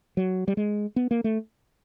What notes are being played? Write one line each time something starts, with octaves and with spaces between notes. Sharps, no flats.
F#3
G3
G#3
B3
A#3
A3